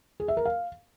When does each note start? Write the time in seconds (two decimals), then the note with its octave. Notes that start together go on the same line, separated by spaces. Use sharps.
0.20 G#4
0.28 E5
0.37 A#4
0.45 F5